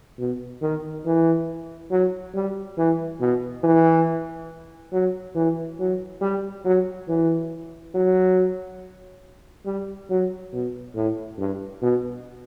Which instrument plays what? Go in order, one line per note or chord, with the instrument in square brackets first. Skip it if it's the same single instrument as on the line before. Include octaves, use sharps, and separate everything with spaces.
[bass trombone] B2
D#3
E3
F#3
G3
E3
B2
E3
F#3
E3
F#3
G3
F#3
E3
F#3
G3
F#3
B2
A2
G2
B2